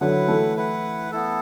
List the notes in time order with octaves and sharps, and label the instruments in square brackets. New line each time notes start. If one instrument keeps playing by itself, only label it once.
[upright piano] D3 F#3 [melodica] E4 B4 F#5
[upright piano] E3 A3
[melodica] E4 B4 F#5
B3 E4 A4